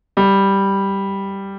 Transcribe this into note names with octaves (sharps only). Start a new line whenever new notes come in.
G3